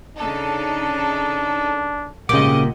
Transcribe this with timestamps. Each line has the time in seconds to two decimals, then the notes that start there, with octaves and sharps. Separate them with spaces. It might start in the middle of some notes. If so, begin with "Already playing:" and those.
0.16 C#3 D4 D#4 A4
2.29 G#1 A#2 C#3 G3 A#3 D#5 F#5 D6